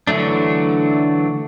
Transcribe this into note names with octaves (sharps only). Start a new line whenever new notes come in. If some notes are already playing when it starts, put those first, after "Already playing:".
D3 E3 F#3 A3 D4